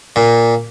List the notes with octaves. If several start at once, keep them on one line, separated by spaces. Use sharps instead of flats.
A#2